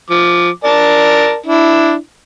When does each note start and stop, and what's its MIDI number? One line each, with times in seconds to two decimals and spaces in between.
0.10 0.50 53
0.10 0.50 86
0.64 1.36 70
0.64 1.36 74
0.64 1.36 81
1.46 1.93 62
1.46 1.93 64